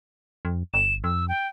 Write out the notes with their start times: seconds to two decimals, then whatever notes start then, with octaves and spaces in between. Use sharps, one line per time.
0.45 F2
0.74 G1 E7
1.04 F2 E6
1.28 G5